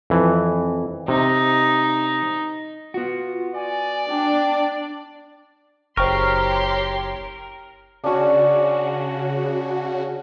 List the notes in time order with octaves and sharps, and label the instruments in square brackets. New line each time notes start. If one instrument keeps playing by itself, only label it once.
[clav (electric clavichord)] F2 E3
[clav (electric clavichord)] C3 [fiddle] D#4
[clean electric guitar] B3 F#4 [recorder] F4
[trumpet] D5 [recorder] G#5
[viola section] D4 [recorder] G5
[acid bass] F#1 [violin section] G4 C#5 C6 [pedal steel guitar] A#4 [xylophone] C5 G5 C#6
[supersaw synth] C#3 F#4 [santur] C#4 D4